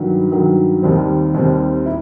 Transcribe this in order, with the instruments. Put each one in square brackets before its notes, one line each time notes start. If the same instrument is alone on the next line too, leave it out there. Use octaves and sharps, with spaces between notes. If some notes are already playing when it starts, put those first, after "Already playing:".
Already playing: [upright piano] G2 D#3 F#3
G2 D#3 F#3
D#2 D#3 G3 C4
D#2 D#3 G3 C4
E4